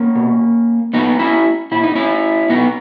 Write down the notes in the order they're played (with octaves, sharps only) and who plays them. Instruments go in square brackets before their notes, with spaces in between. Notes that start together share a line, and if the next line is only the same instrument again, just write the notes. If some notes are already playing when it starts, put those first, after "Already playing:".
Already playing: [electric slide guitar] A#3 C#4
B2
A#2 B3 D#4
C#4 E4
A#2 E4
D#4
C#4 E4
B2 B3 D#4